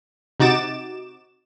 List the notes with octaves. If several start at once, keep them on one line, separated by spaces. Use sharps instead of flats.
C3 D#4 F#4 D6 A6 E7